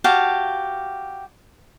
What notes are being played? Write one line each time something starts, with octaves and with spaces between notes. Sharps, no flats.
F#4 G4 F5 A5